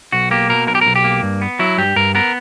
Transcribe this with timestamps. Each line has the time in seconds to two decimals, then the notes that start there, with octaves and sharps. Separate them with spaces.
0.12 B1 F#4
0.31 A#3 G4
0.50 B2 A#4
0.67 B1 A#4
0.75 G4
0.81 B1 A#4
0.96 G4
1.04 A#3
1.23 G2
1.42 B3
1.59 F#3 E4
1.78 G2 G4
1.96 G2 A#4
2.15 B3 A#4